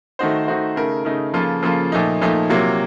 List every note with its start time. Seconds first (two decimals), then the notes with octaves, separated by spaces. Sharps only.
0.19 D#3 A3 D#4 F#4 C5
0.47 D#3 A3 D#4 F#4 C5
0.76 C#3 A3 D#4 A#4
1.05 C#3 A3 D#4 A#4
1.34 C#3 F3 A#3 F4 A4
1.62 C#3 F3 A#3 F4 A4
1.92 A#2 F3 A3 D#4
2.21 A#2 F3 A3 D#4
2.50 C3 F#3 A#3 F4